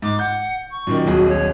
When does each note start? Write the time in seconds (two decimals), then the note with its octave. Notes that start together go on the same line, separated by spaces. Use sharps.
0.02 G#2 D6
0.19 F#5 G6
0.70 C#6
0.87 F#2 A#2 D#3
1.06 D#1 B1 F#4 G#4
1.28 C#5